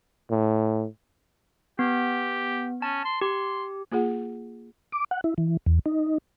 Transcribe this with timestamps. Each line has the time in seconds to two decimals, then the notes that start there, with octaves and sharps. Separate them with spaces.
0.31 A2
1.79 B3 G4
2.82 C#4 A5
3.05 C6
3.21 G4 C6
3.92 A#3 F4 G#4 F#5
4.92 D6
5.11 F#5
5.24 E4
5.38 E3
5.66 E2
5.86 D#4